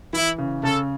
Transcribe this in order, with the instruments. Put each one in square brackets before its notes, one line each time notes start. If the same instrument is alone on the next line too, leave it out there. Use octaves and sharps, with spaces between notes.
[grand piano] E3 [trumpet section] E4
[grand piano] C#3
[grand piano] C#3 [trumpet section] A4